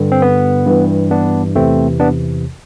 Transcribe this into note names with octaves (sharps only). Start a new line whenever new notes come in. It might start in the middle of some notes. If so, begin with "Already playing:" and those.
Already playing: G2 D3
C4
B3
G2 E3
B3 D4
E2 C3 E3 A3 C4
B3 D4